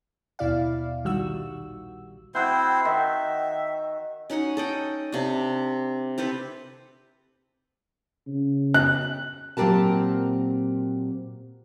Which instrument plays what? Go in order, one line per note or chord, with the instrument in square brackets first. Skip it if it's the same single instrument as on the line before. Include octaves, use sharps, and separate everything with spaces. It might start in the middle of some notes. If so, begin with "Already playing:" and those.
[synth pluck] D#2 B2 E4 D5 F5
A#1 D#3 G3 F#4 E6
[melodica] C4 E4 C5 [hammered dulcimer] F#4 F#5 G5
[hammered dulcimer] D#3 [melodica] E5
[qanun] C#4 D#4 F#4 D#5
A4 D#5 G5
C3 D4
C4 G4 A4 B4
[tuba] C#3
[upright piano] F#6
[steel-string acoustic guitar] A#2 F#3 C4 G4 A#4 A5